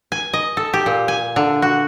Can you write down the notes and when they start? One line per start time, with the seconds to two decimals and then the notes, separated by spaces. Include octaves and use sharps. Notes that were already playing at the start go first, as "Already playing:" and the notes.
0.12 G#5
0.33 D#5
0.57 A4
0.73 G4
0.86 A#2
1.08 G#5
1.36 D3
1.62 F#4